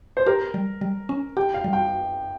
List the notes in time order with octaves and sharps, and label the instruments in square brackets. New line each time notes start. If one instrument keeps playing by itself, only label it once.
[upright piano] C5
[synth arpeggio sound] G4 [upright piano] A#4
[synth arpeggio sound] G3
G3
C#4
[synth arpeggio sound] G4 [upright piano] G5
[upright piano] F5
[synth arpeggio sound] G3
[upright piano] G5